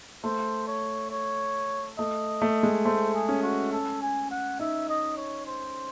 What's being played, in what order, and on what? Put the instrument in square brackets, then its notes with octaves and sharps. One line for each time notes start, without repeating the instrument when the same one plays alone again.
[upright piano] A3 [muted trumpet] C5
[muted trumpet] C#5
C#5
[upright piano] A3 [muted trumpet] D#5
[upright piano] A3
G#3
[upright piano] A3 [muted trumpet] C5
[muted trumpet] G#4
[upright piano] C#4
[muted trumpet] F#4
A4
G#5
F#5
[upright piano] D#4 [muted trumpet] E5
[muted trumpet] D#5
C#5
C5